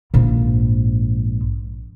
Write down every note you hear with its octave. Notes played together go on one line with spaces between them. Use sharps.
A#1 G#2